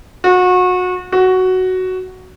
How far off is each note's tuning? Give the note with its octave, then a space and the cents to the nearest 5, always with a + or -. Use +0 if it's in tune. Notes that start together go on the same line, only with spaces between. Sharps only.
F#4 -30
F#4 +5